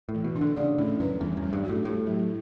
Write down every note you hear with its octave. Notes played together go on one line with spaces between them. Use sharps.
A2
E3
B2
D4
D3
C#3 D5
A2 C#4
F#2 B4
E2 G3
F#2
G3
G2
A2 F#4
A2 G4
F#3